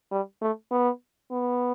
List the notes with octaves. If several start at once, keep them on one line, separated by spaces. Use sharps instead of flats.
G3
A3
B3
B3